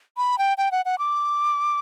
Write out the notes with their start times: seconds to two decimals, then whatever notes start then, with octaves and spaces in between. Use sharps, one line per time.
0.17 B5
0.38 G5
0.58 G5
0.72 F#5
0.85 F#5
0.99 D6